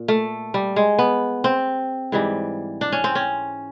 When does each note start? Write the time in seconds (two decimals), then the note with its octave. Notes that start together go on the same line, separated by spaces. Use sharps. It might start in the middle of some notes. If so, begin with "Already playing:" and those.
Already playing: A#2
0.08 A3
0.54 G3
0.76 G#3
0.98 B3
1.44 C4
2.12 G#2 E3 G3
2.81 D4
2.92 C#4
3.04 C4
3.15 C#4